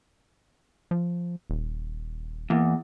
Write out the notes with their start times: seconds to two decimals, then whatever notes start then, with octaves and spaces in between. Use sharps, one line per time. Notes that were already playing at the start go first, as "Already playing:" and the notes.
0.91 F3
1.50 D#1
2.50 E2 A#3